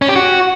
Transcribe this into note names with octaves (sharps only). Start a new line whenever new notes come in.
C#4
G4
F#4